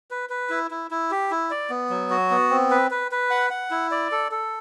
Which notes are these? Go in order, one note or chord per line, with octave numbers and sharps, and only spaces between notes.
B4
B4
E4
E4
E4
G4
E4
D5
B3
F#3
F#4
B3
C4
B4
B4
B4
F#5
F#5
E4
D5
A4
A4